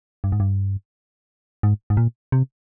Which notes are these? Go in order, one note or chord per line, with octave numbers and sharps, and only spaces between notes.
G2
G#2
G2
G#2
G#2
A#2
C3